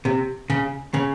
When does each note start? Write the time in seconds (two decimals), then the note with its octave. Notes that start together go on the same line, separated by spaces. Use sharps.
0.05 C3
0.50 C#3
0.94 C#3